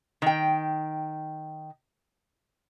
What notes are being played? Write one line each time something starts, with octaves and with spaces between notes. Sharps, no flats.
D#3 G5